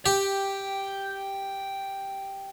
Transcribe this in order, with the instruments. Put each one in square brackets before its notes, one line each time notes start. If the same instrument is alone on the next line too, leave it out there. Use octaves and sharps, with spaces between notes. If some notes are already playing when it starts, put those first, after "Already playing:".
[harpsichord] G4 [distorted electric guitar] G5